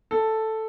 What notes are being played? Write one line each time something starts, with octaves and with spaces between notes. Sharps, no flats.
A4